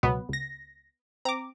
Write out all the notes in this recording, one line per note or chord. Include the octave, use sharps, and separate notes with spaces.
C#2 B2 F#3 B3
C#2 A#6
C4 A#5 D6